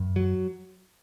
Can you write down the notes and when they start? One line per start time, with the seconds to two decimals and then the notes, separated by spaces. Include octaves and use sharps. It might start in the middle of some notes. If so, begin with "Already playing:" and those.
Already playing: F#2
0.16 F#3